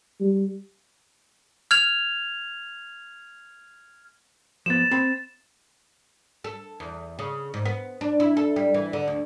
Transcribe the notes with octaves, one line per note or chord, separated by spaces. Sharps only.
G3
F6 G#6 F7
F3 B3 A6 E7
C4 B5
A4
E2
C#3
G#2
B3
D4
E4
A4
G3
E3
D3
D2